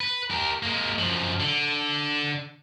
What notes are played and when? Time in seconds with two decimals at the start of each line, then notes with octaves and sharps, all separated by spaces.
0.01 B4
0.31 G4 A#4
0.63 G#3 A#3
0.99 F#2 F3
1.40 D3